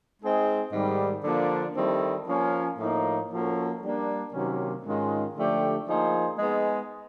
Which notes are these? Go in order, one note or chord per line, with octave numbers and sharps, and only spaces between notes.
G#3 C4 D#4 G#4
G#2 D#3 G3
D3 F3 A#3 D4
D#3 G3 C4 E4 A4
F3 A#3 C#4
A2 F3 A#3 D#4
F3 A#3 C#4 F#4 A4
G3 A#3 D4
C3 D#3 F#3 A#3 C#4
G#2 D#3 G#3 C#4 F4
D3 F3 A3 D4 G4
F3 A#3 D#4 G#4 C5
G#3 B3 D#4 G#4